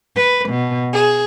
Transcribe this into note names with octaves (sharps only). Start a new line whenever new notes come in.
B4
B2
G#4